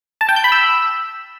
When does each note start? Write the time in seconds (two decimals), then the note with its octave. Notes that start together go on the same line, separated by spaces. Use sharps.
0.21 A5
0.29 G5
0.36 G6
0.44 B5
0.52 E6